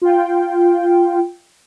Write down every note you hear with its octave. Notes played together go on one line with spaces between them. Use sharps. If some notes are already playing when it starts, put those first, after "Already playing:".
F4 G5